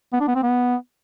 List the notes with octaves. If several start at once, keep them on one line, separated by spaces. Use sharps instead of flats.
B3
D4
B3
C4
B3